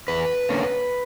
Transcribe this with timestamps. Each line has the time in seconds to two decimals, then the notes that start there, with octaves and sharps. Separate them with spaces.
0.08 E2 B4
0.49 D3 A#3 C#4